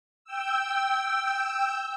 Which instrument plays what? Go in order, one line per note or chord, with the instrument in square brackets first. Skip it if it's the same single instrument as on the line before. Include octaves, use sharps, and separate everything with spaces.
[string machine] G5 E6